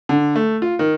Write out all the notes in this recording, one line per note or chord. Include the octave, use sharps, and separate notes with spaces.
D3
A3
F4
D#3